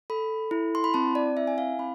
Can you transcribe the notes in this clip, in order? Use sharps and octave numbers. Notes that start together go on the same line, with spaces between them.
A4 B5
E4
C6
B5
C4 A5
D5
E4 E5
G#5
F5
C4 B5